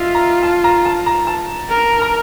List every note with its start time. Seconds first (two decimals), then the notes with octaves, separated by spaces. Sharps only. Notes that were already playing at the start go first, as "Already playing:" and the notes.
Already playing: F4 D#5 E5
0.15 A#5
0.43 A5
0.64 A#5
0.85 A5
1.06 A#5
1.27 A5
1.69 A#4
2.02 A#5